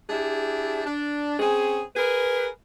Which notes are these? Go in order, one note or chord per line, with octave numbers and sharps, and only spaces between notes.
D4 E4 G4 G#4
D4
C4 C#4 G#4
G#4 A#4 B4